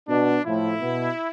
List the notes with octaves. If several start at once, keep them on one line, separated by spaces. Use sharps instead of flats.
B2 D4
A2 F3 E4
B2